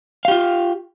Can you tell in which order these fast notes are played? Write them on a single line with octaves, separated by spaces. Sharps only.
F5 G4 F4